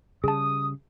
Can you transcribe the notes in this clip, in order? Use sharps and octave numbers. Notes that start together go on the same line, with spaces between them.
C#3 G3 G#4 A5 D#6